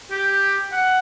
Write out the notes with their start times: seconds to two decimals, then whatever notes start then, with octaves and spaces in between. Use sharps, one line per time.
0.11 G4
0.72 F#5